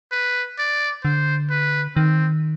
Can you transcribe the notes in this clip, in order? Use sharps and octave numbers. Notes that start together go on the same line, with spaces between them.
B4
D5
D3 C5
B4
D#3 C4